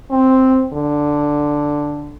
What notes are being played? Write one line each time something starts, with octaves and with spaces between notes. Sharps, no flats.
C4
D3